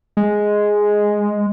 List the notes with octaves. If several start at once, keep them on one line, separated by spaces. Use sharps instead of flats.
G#3